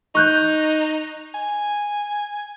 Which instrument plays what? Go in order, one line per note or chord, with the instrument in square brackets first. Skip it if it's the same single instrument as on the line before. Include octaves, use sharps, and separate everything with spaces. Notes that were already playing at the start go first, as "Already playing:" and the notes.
[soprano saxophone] D#4 [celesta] C#6 F#6 G6
[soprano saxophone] G#5